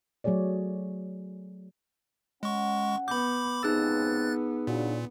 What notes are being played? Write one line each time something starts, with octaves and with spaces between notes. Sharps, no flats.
F#3 A3 G#4 C#5 D5
G#3 C#4 F#5 C#6
B3 B5 D6 G6
C#2 C3 B3 D#4 G#4 E6 F#6 A6
A#2 C#3 D4 F#4